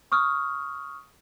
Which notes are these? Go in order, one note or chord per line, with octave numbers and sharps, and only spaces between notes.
C#6 D#6 F6